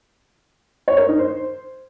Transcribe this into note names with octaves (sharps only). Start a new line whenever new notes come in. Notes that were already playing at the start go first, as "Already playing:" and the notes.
C#5
A#4
D#4
C5